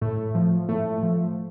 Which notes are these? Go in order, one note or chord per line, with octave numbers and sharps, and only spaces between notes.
A2 A3
F3
A2 A3
F3